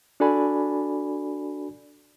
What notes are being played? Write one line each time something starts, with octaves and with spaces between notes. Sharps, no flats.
D4 F#4 A4 D5 G#5 B5